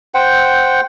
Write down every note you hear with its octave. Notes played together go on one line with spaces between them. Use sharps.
C5 F#5 G5